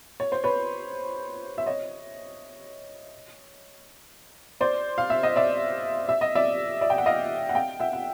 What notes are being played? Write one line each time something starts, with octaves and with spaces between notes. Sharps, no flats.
C#5
C5
B4 C#5
E5
C#5 D#5
C5 D5
F5
E5
D#5
D5 E5
E5
D#5
D5 E5
D5 E5
G5
F#5
D#5 F5
F#5
F5 G5
E5 F#5
F#5